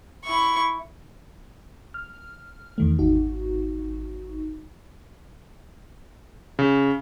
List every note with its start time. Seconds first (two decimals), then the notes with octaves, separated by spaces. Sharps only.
0.25 E4 C#6
1.94 F6
2.78 E2 D#3 A3
2.99 G#1 D#4 F#4
6.59 C#3